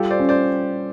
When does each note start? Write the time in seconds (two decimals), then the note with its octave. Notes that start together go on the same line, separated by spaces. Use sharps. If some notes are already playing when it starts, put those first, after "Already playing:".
Already playing: G3 F4 G4 A4
0.11 C5 D5
0.19 C#4
0.29 C5 D5